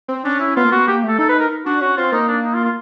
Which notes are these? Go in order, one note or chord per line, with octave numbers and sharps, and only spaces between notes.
C4
C#4 D4
E4
B3 F4
A#3
B3 F#4
A#3 G4
A3 A4
D#4 A4
B4
A#4
D4 F#4
C#4 F#4
C4 F4
A#3 D#4
D4
D#4
F4
F4